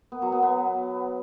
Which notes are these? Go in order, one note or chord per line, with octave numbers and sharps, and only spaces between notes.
B3
F#3
B3
B3